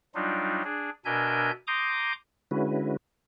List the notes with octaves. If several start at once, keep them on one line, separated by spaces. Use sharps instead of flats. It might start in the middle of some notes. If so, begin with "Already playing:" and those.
F#3 G3 D4 D#4 F4
D4 G#4
B2 D4 A#4 E5 G#5 G6
A#5 C6 D6 D#6 G6
D3 G#3 C#4 E4 F#4 B4